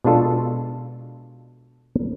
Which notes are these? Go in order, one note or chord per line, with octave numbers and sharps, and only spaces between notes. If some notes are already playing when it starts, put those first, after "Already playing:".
B2 G#3 D4 F4 A4